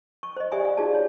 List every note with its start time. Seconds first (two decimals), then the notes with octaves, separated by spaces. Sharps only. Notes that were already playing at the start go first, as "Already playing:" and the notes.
0.23 C#6
0.37 C5 D#5
0.51 G4 D5 E5 G#5 B5
0.65 F5
0.77 D#4 F4 F#4 G#4 D5 A5
0.94 C#5